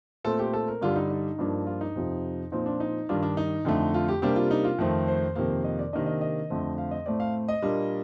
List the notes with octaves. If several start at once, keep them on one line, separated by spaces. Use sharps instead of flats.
A#2 A3 C4 A4
G4
A4
A#4
G2 D3 G3 D4 F4
D#4
D#4
G2 F3 A#3 D4
F4
D#4
F2 C3 F3
A#2 F3 C4 D#4
D4
D#4
G2 D#3 G3 D4 F4
D4
D#4
F2 D3 A3
F4
G4
C3 G3 A#3 D4 G4
F4
D#4
F4
F2 D#3 A3 C4
C5
F2 C3 D#3 A#3
D#5
D5
C3 D#3 A#3 D4 D#5
D#5
D#5
F2 D3 A3 C4
F5
D#5
A2 A3 C4 D5
F5
D#5
A#2 G3 A#3 D4